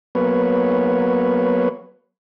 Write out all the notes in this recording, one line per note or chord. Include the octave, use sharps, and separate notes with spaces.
F#3 A#3 B3 B4 C#5